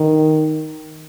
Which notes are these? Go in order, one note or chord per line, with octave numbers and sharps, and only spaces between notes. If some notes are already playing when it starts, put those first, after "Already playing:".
Already playing: D#3